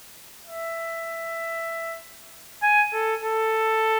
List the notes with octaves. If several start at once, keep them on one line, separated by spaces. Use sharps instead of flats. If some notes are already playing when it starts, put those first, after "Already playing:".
E5
G#5
A4
A4